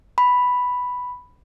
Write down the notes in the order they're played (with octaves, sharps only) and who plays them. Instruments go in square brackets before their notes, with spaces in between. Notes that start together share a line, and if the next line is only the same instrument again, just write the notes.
[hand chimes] B5